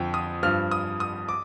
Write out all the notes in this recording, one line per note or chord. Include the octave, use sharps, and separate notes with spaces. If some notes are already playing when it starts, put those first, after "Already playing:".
Already playing: F2 D3 F3 G5
D#6
G2 F3 F6
D#6
D#6
D6